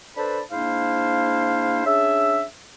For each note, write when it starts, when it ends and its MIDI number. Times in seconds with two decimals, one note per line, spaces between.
0.16 0.40 62
0.16 0.40 69
0.16 0.40 71
0.16 0.40 72
0.16 0.40 81
0.16 0.40 83
0.51 1.83 44
0.51 1.83 58
0.51 1.83 62
0.51 1.83 64
0.51 1.83 72
0.51 1.83 77
1.85 2.43 61
1.85 2.43 62
1.85 2.43 68
1.85 2.43 76